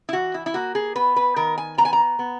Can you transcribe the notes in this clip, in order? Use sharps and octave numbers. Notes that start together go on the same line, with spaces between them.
E4
E3 F#4
E4
E4
A#3 F#4
G#4
B3 B4
B4
D#3 A#4
G#5
B3 A#5
G#5
A#5
B3